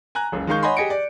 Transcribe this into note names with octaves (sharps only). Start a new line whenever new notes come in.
G#5 A#5 F#6
F#1 C#2
D#3 G#3 D#4 F5 C#6 G6
C#5 D#5 F#5 G#5 B5 C6
G4 G#4 D#5 G#5 C#7 D7
D5